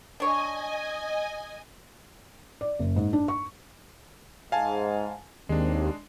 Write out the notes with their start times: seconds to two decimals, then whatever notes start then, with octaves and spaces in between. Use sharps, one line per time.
0.20 D4 C#5 D#5 G#5
2.61 D5
2.79 F#1
2.96 G#2
3.13 D4
3.28 C#6
4.52 G#2 F5 G#5 A5
5.49 D#2 G#3 C4 D4